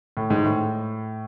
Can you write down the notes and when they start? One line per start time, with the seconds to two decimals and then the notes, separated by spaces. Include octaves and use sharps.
0.17 A2
0.30 G#2
0.44 A2